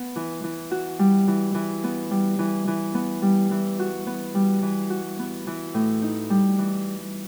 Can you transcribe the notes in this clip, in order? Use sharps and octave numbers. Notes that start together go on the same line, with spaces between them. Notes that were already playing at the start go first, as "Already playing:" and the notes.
Already playing: B3
E3
E3
F#4
G3
E3
E3
B3
G3
E3
E3
B3
G3
E3
F#4
B3
G3
E3
F#4
B3
E3
A2
D#4
G3
E3